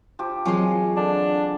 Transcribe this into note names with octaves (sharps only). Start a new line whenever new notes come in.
F3 G4
E3 F#3 G#3 C4 F4 A#4 C#5 G#5
D3 D4